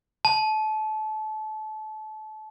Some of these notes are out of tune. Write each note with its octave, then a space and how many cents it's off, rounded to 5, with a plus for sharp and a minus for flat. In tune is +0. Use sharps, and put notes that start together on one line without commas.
A5 -30